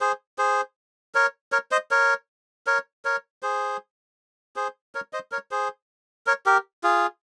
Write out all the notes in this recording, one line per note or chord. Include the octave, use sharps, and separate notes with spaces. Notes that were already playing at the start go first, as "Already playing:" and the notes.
G#4 C5
G#4 C5
A#4 C#5
A#4 C#5
C5 D#5
A#4 C#5
A#4 C#5
A#4 C#5
G#4 C5
G#4 C5
A#4 C#5
C5 D#5
A#4 C#5
G#4 C5
A#4 C#5
G4 A#4
F4 G#4